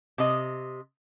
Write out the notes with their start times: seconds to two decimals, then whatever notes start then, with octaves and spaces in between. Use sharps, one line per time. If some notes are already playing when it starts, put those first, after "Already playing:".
0.18 C3 D#5